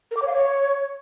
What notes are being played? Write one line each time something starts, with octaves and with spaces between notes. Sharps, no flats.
A#4
D6
C#5
F5
C#5